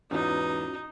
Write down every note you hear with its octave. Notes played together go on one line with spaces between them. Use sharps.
E2 G#2 B3 C#4 D#4 F4 F#4